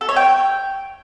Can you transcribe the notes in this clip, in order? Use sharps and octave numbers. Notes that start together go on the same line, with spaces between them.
A4
C#5
G5